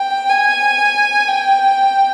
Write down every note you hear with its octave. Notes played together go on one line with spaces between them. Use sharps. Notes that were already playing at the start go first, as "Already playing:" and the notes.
Already playing: G5
G#5
G5